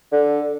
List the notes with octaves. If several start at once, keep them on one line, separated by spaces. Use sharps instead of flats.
D3